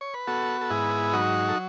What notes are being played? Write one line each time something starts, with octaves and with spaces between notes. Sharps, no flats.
C#5
B4
B3 F#4 A4
A4
G#2 E4 G#4
F#3 D#4 F#4
A4